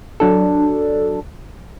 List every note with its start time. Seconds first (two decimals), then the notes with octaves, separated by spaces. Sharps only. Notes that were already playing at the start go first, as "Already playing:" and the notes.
0.20 F#3 D4 A4